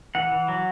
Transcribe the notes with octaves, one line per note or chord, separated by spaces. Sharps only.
E3 F#5
E3
F#3